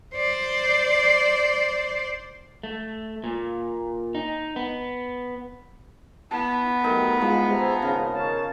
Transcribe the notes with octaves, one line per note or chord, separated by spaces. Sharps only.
C5 D5
A3
A#2
D#4
B3
B3 E4 A5
F#3 A3 D#4 G4 A#4
F3 G#3 E4
G4 G#4 C5 E5 A#5
G#1 G#2 C#3
A#4 C#5 F5 A5